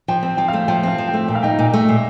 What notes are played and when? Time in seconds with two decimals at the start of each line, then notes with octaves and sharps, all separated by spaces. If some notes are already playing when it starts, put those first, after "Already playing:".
0.08 F3 G5
0.23 C4
0.37 F3 G5
0.48 A3 F5
0.68 F3 G5
0.83 C4 F5
0.98 F3
1.08 G5
1.13 A3
1.28 A#2 G5
1.35 F5
1.43 D#4 G5
1.59 A#2
1.74 A3
1.89 A#2